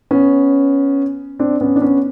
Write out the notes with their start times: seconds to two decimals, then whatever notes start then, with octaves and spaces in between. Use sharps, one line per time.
0.11 B3 C#4
1.39 C4 D4
1.61 B3 C#4
1.76 D4
1.82 B3 C#4